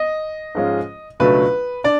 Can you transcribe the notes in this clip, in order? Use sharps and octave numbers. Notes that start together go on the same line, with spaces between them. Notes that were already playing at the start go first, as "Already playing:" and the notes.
Already playing: D#5
G#2 F3 G#3 C#4 F4
C#2 B2 F#3 A3 D4 B4
D4 D5